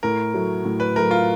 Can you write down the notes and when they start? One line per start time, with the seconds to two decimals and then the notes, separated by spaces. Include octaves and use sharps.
0.03 A2 A#4
0.34 F#3 A3
0.65 A2
0.80 B4
0.96 A3 A#4
1.00 F#3
1.11 F4